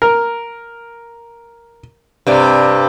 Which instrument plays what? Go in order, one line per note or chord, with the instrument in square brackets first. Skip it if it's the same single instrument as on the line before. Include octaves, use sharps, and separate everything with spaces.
[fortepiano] A#4
[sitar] G2 C3 D5